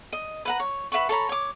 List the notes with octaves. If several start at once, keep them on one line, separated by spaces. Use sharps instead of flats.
D#5
B4 F#5 A#5
C#5
B4 E5 F#5 C#6
A4 C#5 A#5 B5
C#5 D6